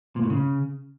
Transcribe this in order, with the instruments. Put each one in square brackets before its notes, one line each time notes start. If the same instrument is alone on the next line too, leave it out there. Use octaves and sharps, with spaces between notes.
[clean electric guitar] A#2
A2
C#3